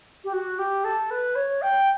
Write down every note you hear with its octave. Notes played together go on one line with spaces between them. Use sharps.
G4
F#4
G4
A4
B4
C#5
G5